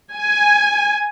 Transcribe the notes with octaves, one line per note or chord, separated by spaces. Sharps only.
G#5